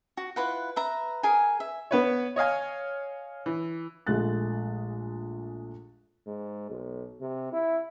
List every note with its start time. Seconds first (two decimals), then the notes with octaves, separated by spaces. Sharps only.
0.17 F#4
0.36 E4 F4 B4 F#5
0.76 B4 E5 A#5
1.23 G#4 A#4 G#5
1.60 E5
1.91 B3 B4 C#5
2.36 C#5 D#5 F5 G#5
3.46 E3
4.07 A#1 G#3 A3 F#6 A6
6.26 G#2
6.70 B1
7.20 C3
7.52 E4